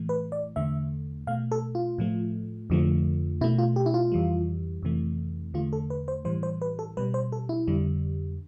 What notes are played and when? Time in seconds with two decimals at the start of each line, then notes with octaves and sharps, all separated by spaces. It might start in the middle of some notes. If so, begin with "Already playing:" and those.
Already playing: A2 E3 A3
0.09 B4
0.32 D5
0.56 E2 D3 A3 E5
1.27 B2 A3 F5
1.52 A4
1.75 F4
1.98 A2 F3 A3
2.70 F2 D3 F3 A3
3.41 B2 A3 E4
3.59 F4
3.76 G4
3.86 E4
3.94 F4
4.12 F2 E3 G3
4.83 F2 C3 E3 A3
5.54 E2 D3 A3 F4
5.73 A4
5.90 B4
6.08 C5
6.25 A2 E3 G3 C5
6.43 C5
6.62 B4
6.79 A4
6.97 B2 G3 B4
7.14 C5
7.32 A4
7.49 E4
7.68 F2 D3 G3